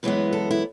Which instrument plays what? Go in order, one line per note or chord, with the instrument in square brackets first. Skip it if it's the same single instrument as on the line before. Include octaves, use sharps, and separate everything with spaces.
[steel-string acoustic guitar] F#2 E3 G#3 B3 B4
A4
E4